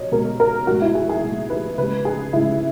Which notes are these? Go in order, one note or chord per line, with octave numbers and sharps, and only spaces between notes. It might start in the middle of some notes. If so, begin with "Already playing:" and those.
Already playing: B2 C#5 D#5
B2 G#3 A#4
A#4
B2 G#3 F#4
E4
G#4
G#4
B2 G#3
B4
C#3 G#3 B4
G#4
C#3 G#3 E4